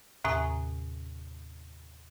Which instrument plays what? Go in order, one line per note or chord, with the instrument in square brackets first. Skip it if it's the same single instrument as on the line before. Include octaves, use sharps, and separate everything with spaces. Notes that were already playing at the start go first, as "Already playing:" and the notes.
[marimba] D#2 A2 C3 G#5 A#5 D#6